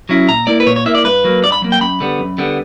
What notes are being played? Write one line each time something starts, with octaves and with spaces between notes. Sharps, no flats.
F#3 C#4 E4
A#2 A#5
A#3 E4 D5
B4
A#2 C#5
C#5
A#3 E4 E5
D5
G2 B4
F#3 A#3
G2 D5
B5
F#3 A#3
G5
F#2 B5
D3 G3 B3
F#2
D3 G3 B3